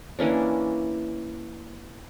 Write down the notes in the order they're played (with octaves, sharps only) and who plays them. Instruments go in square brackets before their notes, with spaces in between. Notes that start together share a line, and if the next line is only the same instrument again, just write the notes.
[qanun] E3 A#3 C#4 D4